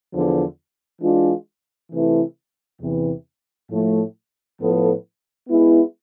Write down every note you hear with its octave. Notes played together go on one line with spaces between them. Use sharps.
E2 D3 F3
E3 G#3 D4 F4
C3 E3 A3 E4 B4
E2 C3 E3
A2 F3 A3
A2 F3 B3 F4 A4
G#3 B3 E4